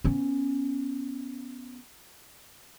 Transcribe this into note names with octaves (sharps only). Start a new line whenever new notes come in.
B3 C#4